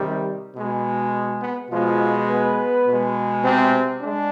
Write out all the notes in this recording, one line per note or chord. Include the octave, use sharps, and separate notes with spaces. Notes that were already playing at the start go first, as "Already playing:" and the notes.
Already playing: C3 D#3 G3
B2 G#3
B3
B2 F3 G#3 F4
B3 B4
B2 G#3
C3 C4
G#3 D4